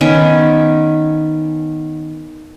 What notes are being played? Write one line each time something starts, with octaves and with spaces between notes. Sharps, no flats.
D#3 B3 C#4